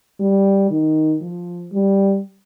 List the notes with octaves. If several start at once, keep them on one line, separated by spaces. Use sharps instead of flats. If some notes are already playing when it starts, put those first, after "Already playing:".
G3
D#3
F3
G3